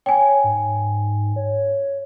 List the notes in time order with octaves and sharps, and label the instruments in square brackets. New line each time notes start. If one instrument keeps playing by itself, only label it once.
[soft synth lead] C#5 [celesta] G5 G#5
[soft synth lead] G#2
C#5